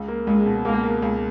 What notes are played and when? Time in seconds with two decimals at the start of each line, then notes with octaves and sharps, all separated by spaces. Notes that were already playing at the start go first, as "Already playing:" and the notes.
Already playing: C#2
0.08 A#3
0.27 C#2 G#3
0.46 B2
0.64 C#2 A#3
0.84 A#3
1.02 C#2